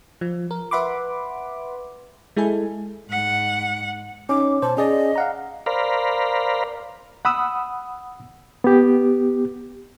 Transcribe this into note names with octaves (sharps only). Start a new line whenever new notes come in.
F3
A#4
B4 E5 F#5 B5 C6 D6
G#3 E4 A4 G#5
G#2 F#5
C#4 D#4 D6
B2 C5 A5
C#4 G#4 D5 D#5
F5 F#5 A#5
A#4 C5 D5 F5 A#5 B5
F#5 B5 D#6 E6
B3 G4